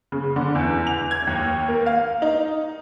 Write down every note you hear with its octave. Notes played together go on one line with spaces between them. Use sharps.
C#3
D3
E2
F7
G#6
D#2
A#3
F5
D#4